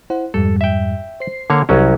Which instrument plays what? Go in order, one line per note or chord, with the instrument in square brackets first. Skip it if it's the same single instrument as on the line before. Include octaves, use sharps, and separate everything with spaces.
[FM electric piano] E4 C5 F#5
[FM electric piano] F2 G#2 G3 [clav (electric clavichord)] A4
[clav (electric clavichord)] E5 G5
[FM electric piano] C5 C7
[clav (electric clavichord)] D3 A#3 C#5
[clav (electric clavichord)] C2 F#3 C#4 [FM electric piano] E4